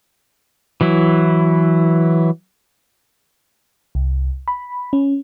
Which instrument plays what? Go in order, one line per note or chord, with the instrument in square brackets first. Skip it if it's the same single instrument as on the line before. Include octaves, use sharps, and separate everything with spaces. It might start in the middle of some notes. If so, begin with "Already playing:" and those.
[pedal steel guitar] E3 F#3 E4
[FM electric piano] C2
B5
C#4